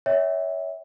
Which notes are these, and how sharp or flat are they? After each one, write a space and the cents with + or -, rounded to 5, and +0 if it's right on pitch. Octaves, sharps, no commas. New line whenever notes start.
C#5 +20 E5 -25 G5 +0